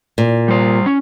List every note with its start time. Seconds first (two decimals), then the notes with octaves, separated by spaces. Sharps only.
0.18 A#2
0.48 G3 C5
0.86 C#4